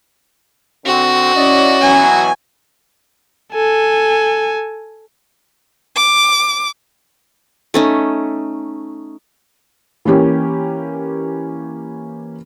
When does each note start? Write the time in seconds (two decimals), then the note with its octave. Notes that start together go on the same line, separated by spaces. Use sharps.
0.86 D3 C4 F#4
1.36 C#4 E4 D5 D#5
1.81 B2 E3 F#3 G#5
3.53 A4 G#5
5.97 D6
7.74 A3 C#4 D#4
10.05 E3 A#3 C#4 G4